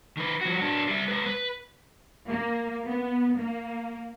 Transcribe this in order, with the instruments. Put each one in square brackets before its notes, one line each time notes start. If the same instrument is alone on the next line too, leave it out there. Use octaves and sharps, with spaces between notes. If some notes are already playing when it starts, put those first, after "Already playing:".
[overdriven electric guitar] D#3 B4
F3 F#4
F#3 D4
G3 E5
G#3 B4
B4
[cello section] A#3
B3
A#3